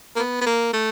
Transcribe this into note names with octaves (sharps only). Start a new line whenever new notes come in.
A#3
B3
B3
A#3
A3